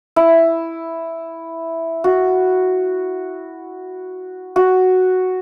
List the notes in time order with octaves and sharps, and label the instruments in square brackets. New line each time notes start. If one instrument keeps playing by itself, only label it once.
[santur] E4
F#4
F#4